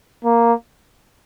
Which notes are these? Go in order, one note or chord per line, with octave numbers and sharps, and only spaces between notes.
A#3